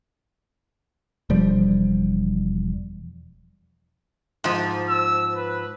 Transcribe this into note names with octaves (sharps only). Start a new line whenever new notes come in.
E1 F3 G3
G#2 F3
E6
B4